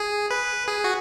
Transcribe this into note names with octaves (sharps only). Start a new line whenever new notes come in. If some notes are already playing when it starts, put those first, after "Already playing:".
Already playing: G#4
B4
G#4
F#4